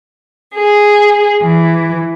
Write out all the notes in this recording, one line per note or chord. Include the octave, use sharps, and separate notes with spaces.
G#4
E3